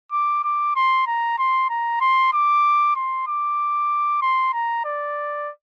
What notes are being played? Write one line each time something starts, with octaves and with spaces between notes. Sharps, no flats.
D6
D6
C6
A#5
C6
A#5
C6
D6
C6
D6
C6
A#5
D5